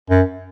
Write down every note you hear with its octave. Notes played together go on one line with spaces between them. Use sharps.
F#2